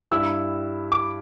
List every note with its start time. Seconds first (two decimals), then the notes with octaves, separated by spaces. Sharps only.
0.11 G2 G3 E4 E6
0.92 D6